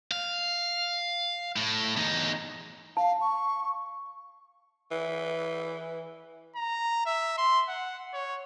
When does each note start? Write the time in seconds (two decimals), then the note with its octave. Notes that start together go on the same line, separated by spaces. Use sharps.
0.11 F5
1.56 A2
1.97 E2 D#4
2.97 F5 A5
3.21 C#6
4.91 E3
6.56 A#5
7.06 E5
7.38 C6
7.69 F#5
8.13 C#5